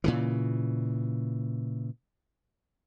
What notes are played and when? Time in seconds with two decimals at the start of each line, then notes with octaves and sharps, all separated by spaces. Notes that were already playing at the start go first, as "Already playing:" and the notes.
0.04 A#2 C#3 E3